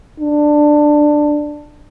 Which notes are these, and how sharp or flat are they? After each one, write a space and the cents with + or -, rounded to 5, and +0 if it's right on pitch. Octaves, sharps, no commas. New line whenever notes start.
D4 +10